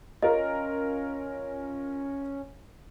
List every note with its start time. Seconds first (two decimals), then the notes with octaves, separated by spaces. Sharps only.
0.22 C#4 F4 A#4 D#5